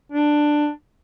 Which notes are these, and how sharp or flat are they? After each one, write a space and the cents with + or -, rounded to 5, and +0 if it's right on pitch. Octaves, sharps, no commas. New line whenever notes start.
D4 +10